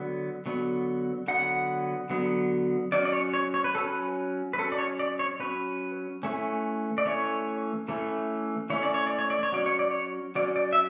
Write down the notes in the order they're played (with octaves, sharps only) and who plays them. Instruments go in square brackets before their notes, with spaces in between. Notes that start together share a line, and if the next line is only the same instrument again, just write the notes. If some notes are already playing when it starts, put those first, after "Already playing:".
Already playing: [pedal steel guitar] D3 F#3 B3
D3 F#3 B3
D3 F#3 B3 F#5
D3 F#3 B3
F#3 C#4 D5
D5
C#5
C#5
C#5
B4
F#3 C#4 A4
B4
B4
F#3 C#4 A4
D5
C#5
D5
C#5
F#3 C#4 B4
E3 A3 C#4
D5
E3 A3 C#4 C#5
E3 A3 C#4
E3 A3 C#4 C#5
D5
C#5
D5
C#5
D5
C#5
F#3 C#4 D5
C#5
D5
C#5
F#3 C#4 D5
D5
E5